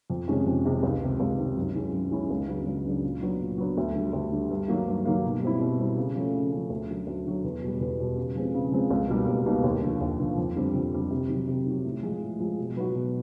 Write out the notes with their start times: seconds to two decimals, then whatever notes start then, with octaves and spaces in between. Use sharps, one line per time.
0.10 F2
0.28 C3 D#3 G#3 C#4
0.46 F2
0.65 C3 D#3 G#3 C#4
0.83 C#2
1.01 C3 D#3
1.20 C#2
1.38 C3 D#3
1.56 F#2
1.75 D#3 G#3 C#4 E4
1.93 F#2
2.11 D#3 G#3 C#4 E4
2.30 C#2
2.48 C#3 F#3 B3 D4
2.66 C#2
2.85 C#3 F#3 B3 D4
3.03 A#2
3.22 F#3 B3 D4
3.41 A#2
3.58 F#3 B3 D4
3.77 D2
3.95 D3 G3
4.13 D2
4.32 D3 G3
4.50 G2
4.68 D#3 F#3 A#3
4.87 G2
5.05 D#3 F#3 A#3
5.24 B2
5.42 G3 C4 E4
5.60 B2
5.79 G3 C4 E4
5.97 C#3
6.15 F3 A3 C#4
6.34 C#3
6.52 F3 A3 C#4
6.70 D2
6.89 D3 F#3
7.07 D2
7.26 D3 F#3
7.44 E2
7.62 B2 G3
7.81 E2
7.99 B2 G3
8.17 C#3
8.35 F3 G#3 C4
8.54 C#3
8.72 F3 G#3 C4
8.90 C#2
9.09 B2 G3 A#3 D#4
9.28 C#2
9.46 B2 G3 A#3 D#4
9.64 D#2
9.82 D3 F3
10.01 D#2
10.20 D3 F3
10.37 F2
10.56 D3 G3 C4
10.74 F2
10.93 D3 G3 C4
11.11 C3
11.29 D#3 F#3
11.47 C3
11.66 D#3 F#3
11.84 A2
12.03 F3 G#3
12.21 A2
12.40 F3 G#3
12.58 B2
12.76 F#3 B3 D#4 F#4
12.95 B2